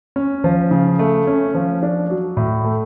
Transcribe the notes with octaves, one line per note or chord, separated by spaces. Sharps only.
C#4
F3
C#3
A3
C#4
F3
D4
F#3
A2
A3